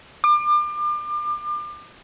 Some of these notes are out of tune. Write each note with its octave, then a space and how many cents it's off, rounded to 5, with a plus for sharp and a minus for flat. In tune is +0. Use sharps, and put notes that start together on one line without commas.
D6 +35